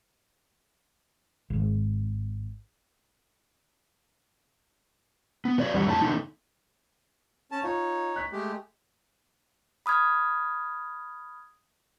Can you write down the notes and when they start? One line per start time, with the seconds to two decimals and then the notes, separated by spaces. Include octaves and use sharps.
1.50 G#1
5.45 B3
5.58 F#3 B4 C#5 D5
5.74 E2 G3 G4 F#5
5.86 F2 A2 F#4 A5
6.02 D3 A3 B3 D#4
7.51 C#4 A5
7.63 D#4 F4 C#5
8.16 F#6 B6
8.32 G#3 A3 G4
9.86 B5 D#6 F6 G#6